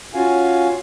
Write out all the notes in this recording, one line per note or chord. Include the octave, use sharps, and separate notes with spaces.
C#4 F4 F#4 F5 G#5